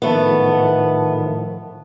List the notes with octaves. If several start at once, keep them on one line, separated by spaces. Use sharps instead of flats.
A2 D#3 F3 A3 B3